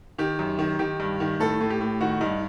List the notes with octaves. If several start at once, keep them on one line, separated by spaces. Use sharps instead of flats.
D#3 G4
F#2
D#3
D#3 G4
G2
D#3
A2 A4
A2
G4
A2
D#3 F#4
G2 D#4